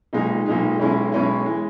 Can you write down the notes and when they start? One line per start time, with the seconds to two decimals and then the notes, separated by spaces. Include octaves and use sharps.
0.13 B1 A#2 G#3 D#4
0.46 B1 A#2 G#3 D#4
0.79 B1 B2 G#3 C#4 E4
1.12 B1 B2 G#3 C#4 E4
1.46 E3 G#3